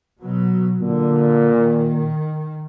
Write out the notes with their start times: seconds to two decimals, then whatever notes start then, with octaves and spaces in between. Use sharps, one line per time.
0.19 B2 F#3
0.82 A#2 D3
1.56 D#3